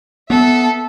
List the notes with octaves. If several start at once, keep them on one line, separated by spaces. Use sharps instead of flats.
B3 A4 E5